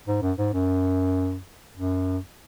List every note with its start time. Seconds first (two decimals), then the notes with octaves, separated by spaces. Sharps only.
0.08 G#2
0.22 F#2
0.38 G#2
0.54 F#2
1.75 F#2